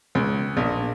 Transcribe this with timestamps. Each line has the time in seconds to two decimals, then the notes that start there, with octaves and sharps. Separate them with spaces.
0.15 C#2
0.57 A#1